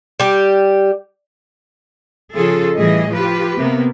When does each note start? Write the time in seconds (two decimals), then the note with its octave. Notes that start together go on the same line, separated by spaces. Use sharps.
0.20 G3 G4
2.34 C#3 F3 F4 G#4 A4
2.77 A2 E3 G3 G#4 D#5
3.11 F3 F4 G4 B4
3.57 C3 A#3 B3